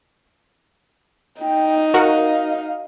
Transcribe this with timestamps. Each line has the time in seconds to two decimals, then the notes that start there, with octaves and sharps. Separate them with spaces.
1.41 D#4 G5
1.94 F#4 A#4 F5 F#5